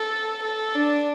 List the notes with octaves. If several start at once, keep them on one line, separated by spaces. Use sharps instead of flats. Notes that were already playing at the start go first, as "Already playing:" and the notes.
Already playing: A4
A4
D4